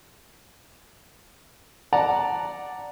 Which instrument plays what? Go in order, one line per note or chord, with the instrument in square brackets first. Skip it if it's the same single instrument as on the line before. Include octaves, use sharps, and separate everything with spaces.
[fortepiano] D5 F#5 A5 A#5